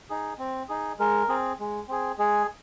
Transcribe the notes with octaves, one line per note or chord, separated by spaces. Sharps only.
D#4 G#4
C4
D#4 G#4
G#3 A#4
C4 G#4
G#3
C4 G#4
G#3 G#4